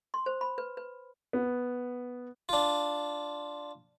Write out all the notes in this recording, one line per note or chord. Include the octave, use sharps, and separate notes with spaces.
C6
C5
B5
B4
B4
B3
D4 F4